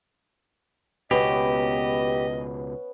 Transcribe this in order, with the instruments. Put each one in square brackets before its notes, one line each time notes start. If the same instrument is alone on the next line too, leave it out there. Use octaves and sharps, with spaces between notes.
[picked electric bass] C#2 B2 [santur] B3 C#4 [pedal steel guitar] G4 [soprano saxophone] D#5